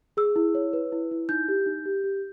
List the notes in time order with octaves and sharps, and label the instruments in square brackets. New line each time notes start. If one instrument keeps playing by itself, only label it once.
[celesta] G#4 E6
E4
C#5
B4
E4
E4
D#4 G6
G4
D#4
G4
G4